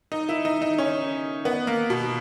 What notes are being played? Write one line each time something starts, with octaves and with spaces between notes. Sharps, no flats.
D#4
E4
D#4
D#4
C#4
B3
A#3
B2